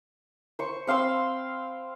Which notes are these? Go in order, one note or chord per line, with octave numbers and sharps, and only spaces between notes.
C5 C#6
C4 F5 C6 E6